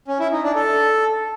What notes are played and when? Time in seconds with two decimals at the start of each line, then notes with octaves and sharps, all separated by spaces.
0.08 C#4
0.20 E4
0.32 D#4
0.43 D4
0.55 A4